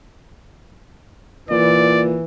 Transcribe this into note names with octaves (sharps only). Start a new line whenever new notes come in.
A#2 E3 D5